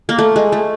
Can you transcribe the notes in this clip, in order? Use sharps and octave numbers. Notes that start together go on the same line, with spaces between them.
A#3
A3
G#3
A3